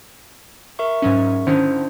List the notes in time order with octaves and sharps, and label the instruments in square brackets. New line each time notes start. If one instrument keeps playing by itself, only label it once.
[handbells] A#4 E5 C#6
[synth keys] G#2 F#3 C#4
[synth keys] D3 D#3 C#4 [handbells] D4 E4 C5